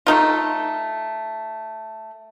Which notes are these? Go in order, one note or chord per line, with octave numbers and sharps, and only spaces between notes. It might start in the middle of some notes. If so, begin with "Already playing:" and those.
A3 D#4 F4